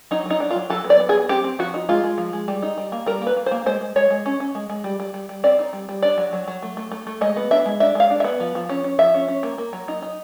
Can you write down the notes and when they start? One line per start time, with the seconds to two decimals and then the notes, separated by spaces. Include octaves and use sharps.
0.11 F#3 D#4
0.26 F#3 D#4
0.40 D4
0.50 F4
0.55 F#3
0.70 F#3 A4
0.84 B3
0.90 D5
1.00 B3
1.09 G#4
1.14 F#3
1.29 C4 G4
1.44 C4
1.59 F3 F#4
1.74 D#4
1.89 G#3 F4
2.04 G#3
2.18 F3
2.33 G#3
2.48 G3
2.62 D#4
2.78 G3
2.92 A#3
3.06 G3 A#4
3.22 A#3
3.27 B4
3.37 A#3
3.46 C5
3.51 A#3
3.66 G#3 C5
3.81 G#3
3.96 G#3 C#5
4.10 G#3
4.26 C#4
4.40 C#4
4.55 G#3
4.70 G#3
4.84 G3
5.00 G3
5.14 G3
5.29 G3
5.44 C4 D5
5.59 D#4
5.73 G3
5.89 G3
6.02 D4 D5
6.18 F#3
6.33 F#3
6.48 F#3
6.62 A3
6.77 A3
6.92 A3
7.07 A3
7.21 G#3 D#5
7.36 B3
7.51 D4 E5
7.66 G#3
7.80 D4 E5
7.95 G#3 F5
8.10 D4
8.20 E5
8.24 B3
8.40 F3
8.55 F3
8.69 C#4
8.84 C#4
8.99 F3 E5
9.14 C#4
9.28 C#4
9.43 A#3
9.58 A#3
9.73 F#3
9.88 D#4
10.02 D#4